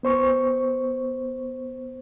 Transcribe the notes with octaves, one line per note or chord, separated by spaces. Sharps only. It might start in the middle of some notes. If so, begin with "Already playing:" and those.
B3 C5 C#6